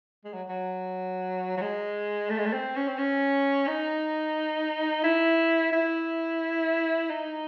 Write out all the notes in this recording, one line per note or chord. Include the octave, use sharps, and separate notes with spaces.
G#3
F#3
F#3
F#3
G#3
A3
G#3
A3
C4
C#4
C4
C#4
D#4
E4
E4
D#4